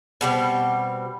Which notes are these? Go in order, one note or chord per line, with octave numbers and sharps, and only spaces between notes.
B2 G3 C4